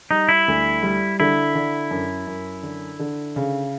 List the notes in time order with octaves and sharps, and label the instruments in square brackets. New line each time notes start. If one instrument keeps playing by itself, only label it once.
[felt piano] G3 [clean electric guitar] D#4
[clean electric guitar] E4
[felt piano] D2
G3
[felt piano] D3 [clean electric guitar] E4
[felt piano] D3
F#2
F#2
D3
D3
C#3